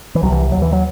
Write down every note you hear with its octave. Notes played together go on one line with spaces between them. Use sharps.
E3
C2 C3 F#3
E3
D#2 F#3
E3
F#3